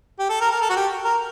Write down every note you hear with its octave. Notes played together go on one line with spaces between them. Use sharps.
G4
A4
A#4
A#4
A4
F#4
G4
A#4